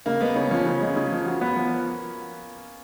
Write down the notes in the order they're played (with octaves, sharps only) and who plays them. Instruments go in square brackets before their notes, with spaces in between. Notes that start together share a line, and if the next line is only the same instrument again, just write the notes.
[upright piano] C#3 [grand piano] A#3
[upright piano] G#3 [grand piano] B3
[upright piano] C#3 [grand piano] C#4
[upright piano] F3 [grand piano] C#4
[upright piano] C#3
G#3
C#3
F3
F#4
B3
F3